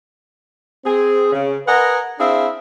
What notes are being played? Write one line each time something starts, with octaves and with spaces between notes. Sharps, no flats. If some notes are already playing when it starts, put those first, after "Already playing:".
C4 G#4
C#3
A#4 B4 D#5 F#5 G#5
C4 D4 E4 G#4 E5 F5